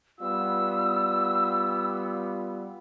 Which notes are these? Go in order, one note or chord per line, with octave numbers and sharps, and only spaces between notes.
G3 B3 F4 E6